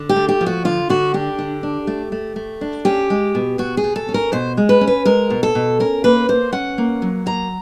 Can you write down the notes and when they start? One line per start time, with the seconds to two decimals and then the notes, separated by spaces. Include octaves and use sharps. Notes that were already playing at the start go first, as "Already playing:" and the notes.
Already playing: D3
0.09 G4
0.16 A3
0.29 G4
0.41 F3
0.46 F#4
0.65 D3 F4
0.89 D3 F#4
1.14 D4 G4
1.39 D3
1.63 D4
1.87 A3
2.12 A3
2.36 A3
2.61 D4
2.85 C#4 G4
3.10 G#3
3.35 B2
3.58 B2 F#4
3.77 G#4
3.84 B2
3.96 A4
4.09 C#4
4.14 A#4
4.32 B2 C5
4.57 G#3
4.69 B4
4.81 C#4
4.87 B4
5.05 G#3 A#4
5.30 B2
5.43 A4
5.55 B2
5.80 C#4 A#4
6.04 A#3 B4
6.29 A#3 C5
6.53 C#4 F#5
6.78 A#3
7.02 F#3
7.26 A#3 A#5